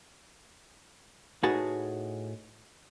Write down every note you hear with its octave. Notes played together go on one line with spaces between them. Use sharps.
A2 D#4 F#4 G#4 B4 A5